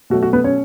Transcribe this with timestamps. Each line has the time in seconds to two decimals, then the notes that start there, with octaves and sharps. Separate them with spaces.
0.10 B2 F#3 A3 F#4
0.23 F#4
0.33 B3 B4
0.44 C#4 C#5